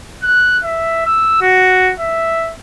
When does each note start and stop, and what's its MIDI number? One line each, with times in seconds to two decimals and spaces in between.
0.23 0.58 90
0.64 1.03 76
1.06 1.39 88
1.41 1.91 66
1.99 2.53 76